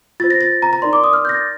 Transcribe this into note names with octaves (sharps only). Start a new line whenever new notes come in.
F4 C5 A6
A#6
A6
A#5
A#5
D#4 A#4 D5 C6
D6
D#6
F6
G6 A#6
A6